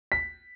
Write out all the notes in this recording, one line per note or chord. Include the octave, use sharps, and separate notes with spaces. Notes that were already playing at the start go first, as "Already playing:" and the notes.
B6